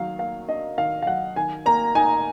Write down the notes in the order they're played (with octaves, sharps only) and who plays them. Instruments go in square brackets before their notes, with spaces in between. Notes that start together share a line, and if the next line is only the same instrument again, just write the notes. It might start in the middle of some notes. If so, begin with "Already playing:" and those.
Already playing: [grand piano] D#3 F#3 F5
A#3 F5
D4 D#5
D#3 F5
F5
F#3 F#5
D#3 G#5
A#3 A#5
D#4 G#5